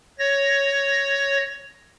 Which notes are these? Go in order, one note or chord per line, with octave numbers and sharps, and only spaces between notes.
C#5 A#6